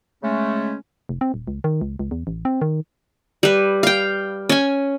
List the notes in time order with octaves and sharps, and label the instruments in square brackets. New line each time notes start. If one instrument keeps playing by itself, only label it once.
[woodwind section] C#3 G#3 A3 C#4
[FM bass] F1
C4
D#1
C#2
D#3
C#2
C#2
E2
A1
C4
D#3
[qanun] G3 B4
F5 G5
C#4 G#5